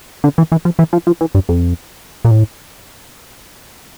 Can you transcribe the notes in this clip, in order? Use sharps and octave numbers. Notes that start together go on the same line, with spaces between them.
D3
E3
E3
F3
E3
F3
F3
E3
G2
F2
A#2
A2